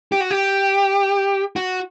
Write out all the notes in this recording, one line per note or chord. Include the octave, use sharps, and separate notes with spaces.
G4
F#4
G4
F#4